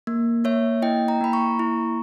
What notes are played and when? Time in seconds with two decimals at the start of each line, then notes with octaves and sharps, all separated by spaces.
0.07 A#3
0.44 A#3 C#5 E5
0.82 E4 D#5 G5
1.08 G5 A#5
1.21 A#3 B5
1.33 A#5 C#6
1.59 E4